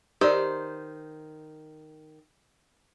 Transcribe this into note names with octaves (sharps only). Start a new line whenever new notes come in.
D#3 G4 C5 D5